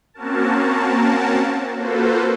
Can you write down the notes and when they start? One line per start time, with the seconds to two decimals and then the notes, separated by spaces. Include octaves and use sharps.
0.14 A#3 C4 C#4 F#4 A#4 A5
1.76 A#3 F4 F#4 A4 B4 C5